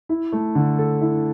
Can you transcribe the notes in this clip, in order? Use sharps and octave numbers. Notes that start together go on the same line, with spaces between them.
E4
A3
D3
A4
E4